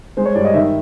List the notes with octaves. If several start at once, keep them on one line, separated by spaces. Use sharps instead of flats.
G#3 C5
C#5
G2 D5
D#5
D#3 E5